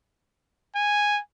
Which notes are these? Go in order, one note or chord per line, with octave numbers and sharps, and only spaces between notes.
G#5